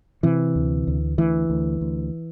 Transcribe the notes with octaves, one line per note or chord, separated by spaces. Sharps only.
C3 E3
D2
D2
D2 E3
D2
D2